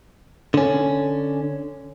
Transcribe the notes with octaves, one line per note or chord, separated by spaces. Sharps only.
D3 C#4